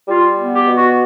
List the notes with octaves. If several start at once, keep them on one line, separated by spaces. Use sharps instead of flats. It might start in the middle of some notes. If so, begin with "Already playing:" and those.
G3 F4
B3
G4
B2
F#4